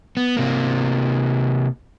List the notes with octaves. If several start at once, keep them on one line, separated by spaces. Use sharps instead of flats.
B3
C3 A#3